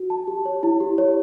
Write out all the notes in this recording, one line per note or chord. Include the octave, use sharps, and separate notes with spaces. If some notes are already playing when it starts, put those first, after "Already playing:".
Already playing: F#4
A5
G4
C#5
E4
G4
C#5